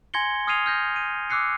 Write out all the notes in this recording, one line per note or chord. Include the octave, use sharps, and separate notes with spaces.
G#5 C6 G#6 A#6 C#7 G7
D#6 F6 G#6 C7 D#7 F7
F6 G6 A#6
D#7
D6 E6 F#6 C7 C#7